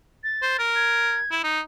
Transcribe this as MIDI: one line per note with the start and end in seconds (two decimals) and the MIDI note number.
0.24 0.58 93
0.42 0.58 72
0.59 1.19 70
0.75 1.34 92
1.31 1.42 64
1.44 1.61 63